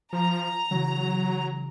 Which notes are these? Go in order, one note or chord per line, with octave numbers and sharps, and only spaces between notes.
F3 A#5
C#3 E3 F#3